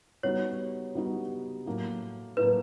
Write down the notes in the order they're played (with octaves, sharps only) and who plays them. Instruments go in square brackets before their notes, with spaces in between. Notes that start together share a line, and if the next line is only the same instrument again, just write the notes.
[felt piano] G3 B3 D#4 F#4 [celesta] C#5
[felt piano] G3 B3 D#4 F#4
A2 F#3 A#3
[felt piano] A2 F#3 A#3 [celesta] B4